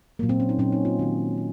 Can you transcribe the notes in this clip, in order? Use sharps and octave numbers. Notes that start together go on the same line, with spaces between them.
A#2 F#3 A#3
C4
C#4
D#4
A#2 F#3 A#3 C#4
D#4
F4
D#3 A#3 F#4
C4